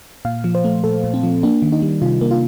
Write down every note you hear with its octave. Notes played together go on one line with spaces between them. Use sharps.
A#2 F5
F3
C5
A3
A#2 A4
A#2
C4
F3
A#3 D4
D#3
D#4
G3
C3 F4
A#3
F4